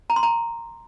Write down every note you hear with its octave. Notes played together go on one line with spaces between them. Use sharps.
A#5
C6
A#5